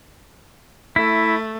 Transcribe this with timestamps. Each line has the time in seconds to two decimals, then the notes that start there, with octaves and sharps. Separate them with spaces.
0.96 A3 E4